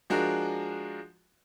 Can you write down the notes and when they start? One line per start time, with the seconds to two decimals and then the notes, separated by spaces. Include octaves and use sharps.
0.10 F3 G#3 D4 F#4 A#4